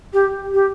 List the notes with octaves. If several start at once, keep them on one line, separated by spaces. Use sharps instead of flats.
G4
G4